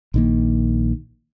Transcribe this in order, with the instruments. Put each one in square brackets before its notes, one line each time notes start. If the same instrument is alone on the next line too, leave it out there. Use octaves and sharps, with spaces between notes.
[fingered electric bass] A#1 D#3 A#3